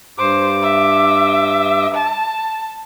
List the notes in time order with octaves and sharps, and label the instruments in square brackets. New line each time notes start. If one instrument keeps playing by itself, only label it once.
[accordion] G2 D6 [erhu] C5
[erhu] E5
A5